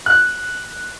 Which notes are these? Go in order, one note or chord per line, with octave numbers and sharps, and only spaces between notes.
F#6